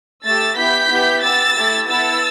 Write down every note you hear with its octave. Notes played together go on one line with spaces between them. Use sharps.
A3 G4 E6 A6
B3 E4 G4 G6 B6
B3 E4 G4
B3 G4 E6 A6
A3 E4 G4
B3 E4 A4 E6 A6